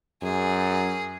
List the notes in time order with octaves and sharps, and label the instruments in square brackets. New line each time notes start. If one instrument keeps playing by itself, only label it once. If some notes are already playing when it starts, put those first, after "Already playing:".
[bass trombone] F#2 [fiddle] G#4